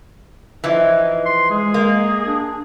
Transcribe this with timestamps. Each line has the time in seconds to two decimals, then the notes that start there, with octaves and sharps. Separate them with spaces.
0.64 E3 F3 D#4
1.26 C6
1.50 G#3 G#4
1.74 A#3
2.27 D4